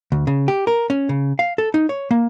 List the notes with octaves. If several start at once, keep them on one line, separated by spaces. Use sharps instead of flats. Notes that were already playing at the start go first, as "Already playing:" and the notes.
D2
C#3
G4
A#4
C#4
C#3
F5
A4
D#4
C#5
A#3